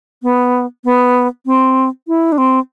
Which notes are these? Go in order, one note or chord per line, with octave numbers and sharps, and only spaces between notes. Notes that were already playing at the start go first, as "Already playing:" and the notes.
B3
B3
C4
E4
D4
C4